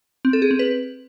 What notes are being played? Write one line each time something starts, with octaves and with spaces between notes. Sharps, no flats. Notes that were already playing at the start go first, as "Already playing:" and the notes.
C4
A4
G#4
C4
B4